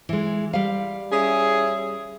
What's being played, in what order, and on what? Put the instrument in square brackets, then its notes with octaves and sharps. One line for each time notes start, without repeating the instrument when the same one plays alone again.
[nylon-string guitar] E3 G#3
G3 F5
[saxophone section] C#4 E4 G#4